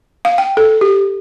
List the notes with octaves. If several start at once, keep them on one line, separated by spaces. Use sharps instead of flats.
F5
G5
A4
G4